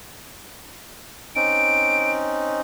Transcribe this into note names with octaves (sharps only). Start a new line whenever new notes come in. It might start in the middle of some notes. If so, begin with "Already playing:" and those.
C4 C#4 D#4 D7